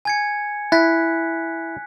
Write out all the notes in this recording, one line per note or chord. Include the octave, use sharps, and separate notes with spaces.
G#5 G#6 C#7
E4 F#6 A6 B6